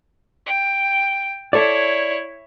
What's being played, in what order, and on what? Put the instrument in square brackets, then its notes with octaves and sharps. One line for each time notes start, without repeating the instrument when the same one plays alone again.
[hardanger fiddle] G5
[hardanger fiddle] E4 C#5 [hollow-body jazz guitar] A4 D5